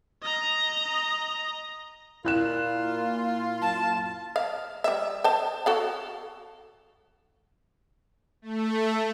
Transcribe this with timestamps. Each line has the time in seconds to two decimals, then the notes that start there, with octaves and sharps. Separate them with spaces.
0.22 D#5 A#5
2.25 A#2 E4 F4 A#4 F#6 E7
3.61 F#2 A#2 A5
4.36 F5
4.84 G3 E5
5.24 C5 A5
5.66 F#4 A4 F5
8.42 A3